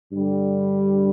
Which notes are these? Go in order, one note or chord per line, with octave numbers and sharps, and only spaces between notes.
G2 D3 G3